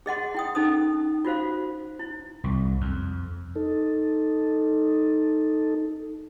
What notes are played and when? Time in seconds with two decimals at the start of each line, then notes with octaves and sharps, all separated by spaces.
0.06 G#4 D#5 F#5 C6
0.34 E4 G5 D#6
0.55 C#4 D#4 A4 D#6
1.25 F4 F#4 C5 F5
1.99 E4
2.44 C2
2.81 F2
3.56 D#4 A4